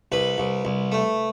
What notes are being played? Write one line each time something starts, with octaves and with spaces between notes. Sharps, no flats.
C2 B4
C2
C2
A3